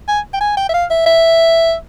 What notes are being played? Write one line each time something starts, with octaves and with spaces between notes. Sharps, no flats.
G#5
G5
G#5
G5
E5
F5
E5
E5